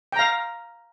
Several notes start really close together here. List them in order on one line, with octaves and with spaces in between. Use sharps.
G5 A#5 F5